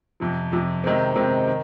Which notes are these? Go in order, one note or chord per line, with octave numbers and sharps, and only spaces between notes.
F2 C3 F3
F2 C3 F3
C3 D#3 G#3 C4
C3 D#3 G#3 C4
D#3